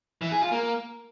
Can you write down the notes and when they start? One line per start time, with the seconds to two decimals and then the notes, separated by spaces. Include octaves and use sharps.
0.22 E3
0.32 G#4
0.42 F4
0.52 A#3